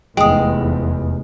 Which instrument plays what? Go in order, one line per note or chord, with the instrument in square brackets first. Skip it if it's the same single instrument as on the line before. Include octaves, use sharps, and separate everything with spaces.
[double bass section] F1 E2 [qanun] G#3 [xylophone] G5 D#6